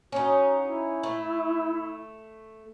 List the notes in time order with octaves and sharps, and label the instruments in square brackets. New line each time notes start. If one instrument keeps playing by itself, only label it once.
[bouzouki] C#4 D#4 [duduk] F#4
[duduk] E4
[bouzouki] A3